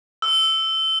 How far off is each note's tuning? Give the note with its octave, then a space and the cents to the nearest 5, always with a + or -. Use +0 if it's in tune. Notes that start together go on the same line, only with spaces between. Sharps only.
E6 +0